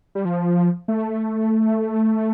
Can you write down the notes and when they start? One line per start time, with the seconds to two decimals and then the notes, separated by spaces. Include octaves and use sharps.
0.15 G3
0.25 F3
0.88 A3